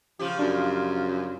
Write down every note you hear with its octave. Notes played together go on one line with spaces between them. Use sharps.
C#3 F3 F4 G4
F#2 D4